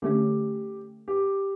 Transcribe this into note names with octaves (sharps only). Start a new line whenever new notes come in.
D3 A3 C#4 G4
G4